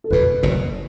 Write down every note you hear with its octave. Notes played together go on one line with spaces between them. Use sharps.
A4
F#1 E2 B2 B4
F#1 E2 B2